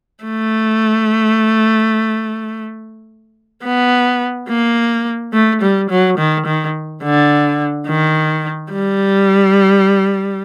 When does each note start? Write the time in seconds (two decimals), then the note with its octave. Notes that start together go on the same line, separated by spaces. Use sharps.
0.24 A3
3.64 B3
4.48 A#3
5.33 A3
5.62 G3
5.90 F#3
6.18 D#3
6.46 D#3
7.03 D3
7.88 D#3
8.72 G3